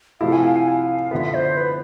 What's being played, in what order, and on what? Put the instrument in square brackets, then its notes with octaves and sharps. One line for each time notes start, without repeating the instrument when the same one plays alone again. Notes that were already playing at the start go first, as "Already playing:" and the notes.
[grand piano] C3 F3 A3 E4 [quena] F5
[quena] G#5
F5
G#5
F5
[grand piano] D3 F3 B3 [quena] E5
[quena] C5
B4